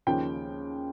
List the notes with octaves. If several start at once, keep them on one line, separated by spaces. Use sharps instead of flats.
D#2 C#3 F3 G5